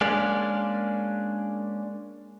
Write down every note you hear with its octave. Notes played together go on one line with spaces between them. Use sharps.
G#3 A#3 C#4 D4 D5